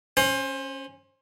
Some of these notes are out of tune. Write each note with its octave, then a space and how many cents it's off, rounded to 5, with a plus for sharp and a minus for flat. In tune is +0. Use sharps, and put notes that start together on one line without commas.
C#4 -15 C5 +25